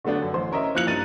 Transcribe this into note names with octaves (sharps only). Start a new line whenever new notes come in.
D3 F#3 A3 B3 D4
F#2
A1 C5 C6
C#4 A#4 D#5 E5
F3 A#3 E4 F#6 C#7 F#7
G2 A#3 A6 D#7